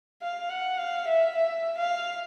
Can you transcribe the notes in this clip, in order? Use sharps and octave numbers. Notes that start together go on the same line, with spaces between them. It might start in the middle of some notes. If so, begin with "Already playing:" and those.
F5
F#5
F5
E5
E5
F5